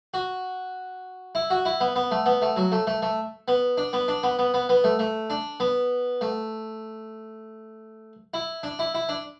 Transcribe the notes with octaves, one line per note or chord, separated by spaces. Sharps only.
F#4
E4
F#4
E4
B3
B3
A3
B3
A3
F#3
A3
A3
A3
B3
D4
B3
D4
B3
B3
B3
B3
A3
A3
D4
B3
A3
E4
D4
E4
E4
D4